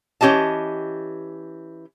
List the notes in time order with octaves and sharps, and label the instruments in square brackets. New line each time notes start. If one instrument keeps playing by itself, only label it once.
[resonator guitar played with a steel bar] E3 C#4 G4 D#5 A5